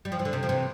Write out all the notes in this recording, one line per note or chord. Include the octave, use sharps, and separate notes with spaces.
G3
F3
E3
D3
C3
F3
C3 E3